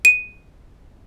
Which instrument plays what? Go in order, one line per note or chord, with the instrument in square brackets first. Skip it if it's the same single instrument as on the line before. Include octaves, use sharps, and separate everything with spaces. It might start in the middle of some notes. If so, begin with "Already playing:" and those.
[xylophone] D#7